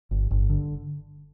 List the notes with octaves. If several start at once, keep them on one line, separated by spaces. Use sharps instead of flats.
G1
G1
D3